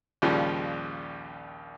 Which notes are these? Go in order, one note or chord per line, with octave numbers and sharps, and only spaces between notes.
A#1 D#2 C#3 F3 G3